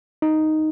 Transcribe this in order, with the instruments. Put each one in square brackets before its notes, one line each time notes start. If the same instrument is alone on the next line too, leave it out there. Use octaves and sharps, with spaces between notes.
[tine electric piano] D#4